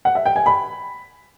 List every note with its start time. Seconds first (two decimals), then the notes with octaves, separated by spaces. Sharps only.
0.05 F#5
0.15 E5
0.26 G5
0.36 G#5
0.46 B5